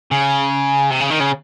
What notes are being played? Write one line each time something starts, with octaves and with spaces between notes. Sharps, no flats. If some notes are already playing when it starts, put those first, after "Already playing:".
C#3
C3
C#3
D#3
C#3